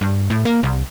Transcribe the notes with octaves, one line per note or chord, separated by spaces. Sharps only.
G2
A2
A#3
C2